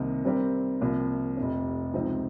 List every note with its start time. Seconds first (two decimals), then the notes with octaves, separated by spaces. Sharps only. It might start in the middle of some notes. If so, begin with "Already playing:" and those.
Already playing: C2 C3 D#3 A#3 D#4
0.25 C3 G3 C4 G4 A#4
0.81 C2 C3 F3 A#3
1.37 F1 F2 C3
1.94 C#2 C3 F3 C4 D#4